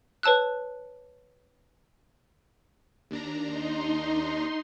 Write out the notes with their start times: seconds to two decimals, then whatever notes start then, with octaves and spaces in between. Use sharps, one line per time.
0.23 B4 C#5 A5 E6 F#6
3.11 D#2 D4 A#5
3.46 D#4 C6